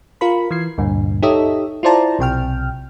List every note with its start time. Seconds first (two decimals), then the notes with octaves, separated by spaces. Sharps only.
0.21 F4 A#4 B5
0.51 E3 G#6 C7
0.78 D2 G2 A#2
1.22 D#4 G4 A4 C#5 D#5 E5
1.83 E4 F4 C5 D5 A5 A#5
2.19 B1 C3 G5 F6